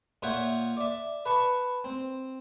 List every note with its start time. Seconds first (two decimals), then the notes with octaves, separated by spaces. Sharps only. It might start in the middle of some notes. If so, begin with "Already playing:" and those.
0.22 A#2 F4 C#5 E5 F#5 G5
0.77 D5 E5
1.26 B4 A5 C#6
1.84 C4